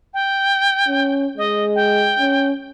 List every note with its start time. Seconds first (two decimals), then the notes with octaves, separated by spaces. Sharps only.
0.14 G5
0.88 C#4
1.38 G#3 D#5
1.75 G5
2.19 C#4